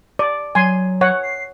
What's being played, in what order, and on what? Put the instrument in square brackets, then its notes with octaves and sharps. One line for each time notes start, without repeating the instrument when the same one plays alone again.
[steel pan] D5
[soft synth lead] F#3 [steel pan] G#5 C6
[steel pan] C#5 F#5
[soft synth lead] C7